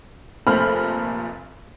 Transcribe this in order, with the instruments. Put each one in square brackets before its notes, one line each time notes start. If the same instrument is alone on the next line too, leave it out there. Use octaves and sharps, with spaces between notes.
[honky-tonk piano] F1 A#2 A3 C5 B5 F6